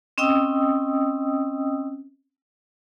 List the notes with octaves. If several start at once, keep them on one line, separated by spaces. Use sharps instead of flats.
C4 C#4 D#5 G5 D#6 E6